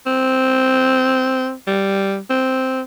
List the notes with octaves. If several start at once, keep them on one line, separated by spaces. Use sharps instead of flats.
C4
G3
C4